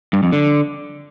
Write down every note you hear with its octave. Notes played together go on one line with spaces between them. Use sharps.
G2
F2
D3